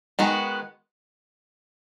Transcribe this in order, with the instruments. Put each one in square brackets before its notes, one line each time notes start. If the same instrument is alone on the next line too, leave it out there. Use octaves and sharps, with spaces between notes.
[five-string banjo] D#3 G#3 B3 F#4